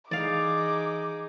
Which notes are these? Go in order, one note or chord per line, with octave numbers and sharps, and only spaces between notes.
E3 D#4 G#4 D5 F5 D6